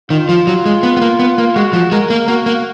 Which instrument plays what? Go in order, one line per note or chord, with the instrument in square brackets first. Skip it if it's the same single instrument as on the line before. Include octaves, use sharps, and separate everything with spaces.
[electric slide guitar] D#3 [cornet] F4
[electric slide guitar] F3
F#3
G#3
B3
B3
A#3
B3
A#3
[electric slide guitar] G#3 [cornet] F#4
[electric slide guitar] F3
[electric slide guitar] G#3 [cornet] A#4
[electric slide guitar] A#3
[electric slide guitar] A#3 [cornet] F#4
[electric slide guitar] A#3